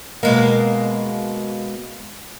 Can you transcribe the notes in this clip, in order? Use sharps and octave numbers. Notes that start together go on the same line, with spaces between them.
B2 G#3 A#3